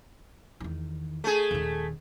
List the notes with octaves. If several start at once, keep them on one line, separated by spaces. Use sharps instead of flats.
E2 D#3
A3 G#4
D#1 D#3